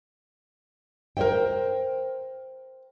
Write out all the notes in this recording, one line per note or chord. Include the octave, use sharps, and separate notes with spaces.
A#4 C5 C#5 E5 G5